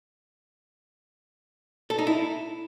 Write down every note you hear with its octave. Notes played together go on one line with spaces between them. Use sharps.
A4
D#4
E4